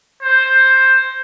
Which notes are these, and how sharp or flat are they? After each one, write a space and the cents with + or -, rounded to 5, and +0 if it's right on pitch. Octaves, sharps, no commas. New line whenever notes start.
C5 +10